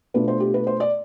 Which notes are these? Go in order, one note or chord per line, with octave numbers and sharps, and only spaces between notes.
B2 A3 D4 F4 B4
C5
G4
B4
C5
D5